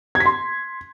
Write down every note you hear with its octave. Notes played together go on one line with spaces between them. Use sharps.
G#6
B6
C6